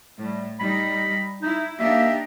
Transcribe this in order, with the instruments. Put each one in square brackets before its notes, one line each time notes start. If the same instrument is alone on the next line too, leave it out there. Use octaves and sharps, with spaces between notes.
[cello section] A2 [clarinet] G3
[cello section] G3 D#4 [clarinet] B5
[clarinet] D#4 [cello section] E4
[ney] A#3 [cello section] D4 D#4 G4 [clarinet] E5